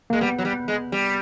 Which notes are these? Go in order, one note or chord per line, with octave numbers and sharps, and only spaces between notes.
G#3 A#3
G3 B3
F#3
G3
G#3
G3